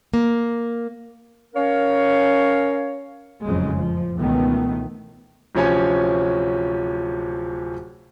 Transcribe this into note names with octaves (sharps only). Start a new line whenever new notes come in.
A#3
C#4 A#4 C#5 F5
F#1 F2 A2 C#3 F#3 G#3
F3
C#2 B2 D#3 E3 A3 B3
D1 C3 F3 C#4 C#5 G#5